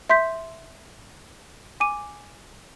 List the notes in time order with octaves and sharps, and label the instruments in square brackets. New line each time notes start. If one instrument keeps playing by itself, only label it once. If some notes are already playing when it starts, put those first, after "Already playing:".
[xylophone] E5 C6 G6 B6
G#5 D6 D#7